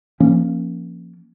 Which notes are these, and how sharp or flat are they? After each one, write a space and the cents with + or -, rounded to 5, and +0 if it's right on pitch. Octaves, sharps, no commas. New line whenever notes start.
F3 -10 A#3 +0 C#4 -20